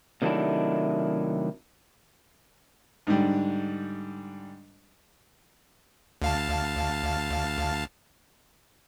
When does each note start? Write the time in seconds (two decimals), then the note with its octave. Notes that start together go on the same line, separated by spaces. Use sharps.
0.22 C3 D#3 F#3 A3 D4 E4
3.07 G#2 D3 G3
6.22 D2 F5 A5